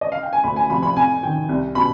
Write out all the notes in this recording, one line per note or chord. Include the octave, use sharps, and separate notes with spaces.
D#5
F5
G5
G#5
D2 B5
G#5
C3 F3 B5
B5
F2 G#5
D#3 G5
C2
B2 B5